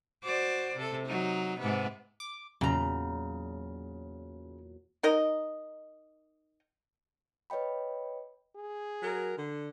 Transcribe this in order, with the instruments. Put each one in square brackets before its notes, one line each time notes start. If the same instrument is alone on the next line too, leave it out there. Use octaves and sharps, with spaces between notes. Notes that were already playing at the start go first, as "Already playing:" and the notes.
[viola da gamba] F#4 C5 D5
C3 A4
F#3 D#4
G#2 C3 B3
[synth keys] D6
[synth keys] E2 A#2 F#3 [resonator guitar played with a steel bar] C#3 A#5
[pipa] D#4 A#4 D#5
[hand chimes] B4 C#5 D#5 G5 B5
[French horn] G#4
[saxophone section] F#3 A#4
D3